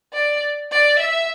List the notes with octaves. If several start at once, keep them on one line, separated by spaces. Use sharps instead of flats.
D5
D5
E5